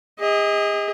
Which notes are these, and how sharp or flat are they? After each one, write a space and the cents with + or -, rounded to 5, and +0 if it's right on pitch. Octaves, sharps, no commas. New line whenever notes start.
G#4 -40 D#5 +25